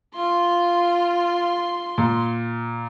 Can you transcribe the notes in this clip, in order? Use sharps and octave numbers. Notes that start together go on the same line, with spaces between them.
F4 C6
A#2